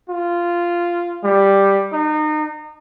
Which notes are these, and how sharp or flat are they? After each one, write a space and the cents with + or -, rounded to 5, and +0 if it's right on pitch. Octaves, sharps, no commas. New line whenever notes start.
F4 -10
G3 +5
D#4 -30